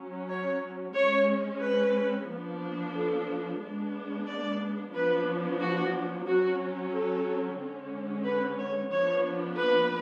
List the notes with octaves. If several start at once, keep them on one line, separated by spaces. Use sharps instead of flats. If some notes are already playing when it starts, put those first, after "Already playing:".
Already playing: F#3 C#4
C#5
G#3 C#4 C#5
B4
F3 B3 D4
A4
G#3 B3 D4
D5
F3 B3 D4 B4
F#4
F#3 C#4 F#4
A4
D3 G#3 C#4
B4
C#5
F3 B3 D4 C#5
B4